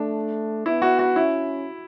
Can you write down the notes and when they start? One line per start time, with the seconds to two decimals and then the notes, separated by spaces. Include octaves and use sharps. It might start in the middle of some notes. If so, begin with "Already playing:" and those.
Already playing: A3 D4
0.66 B3 E4
0.82 F#4
0.99 F#4
1.16 C#4 E4